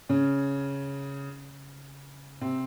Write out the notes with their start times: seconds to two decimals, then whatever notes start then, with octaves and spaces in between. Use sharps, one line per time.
0.09 C#3 C#4
2.41 C3 C4